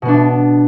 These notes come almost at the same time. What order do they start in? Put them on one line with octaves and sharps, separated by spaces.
B2 B3 D4